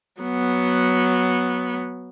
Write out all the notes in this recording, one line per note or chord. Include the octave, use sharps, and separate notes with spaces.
F#3 B3